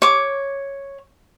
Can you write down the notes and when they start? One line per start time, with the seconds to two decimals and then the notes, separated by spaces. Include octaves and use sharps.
0.02 C#5 D6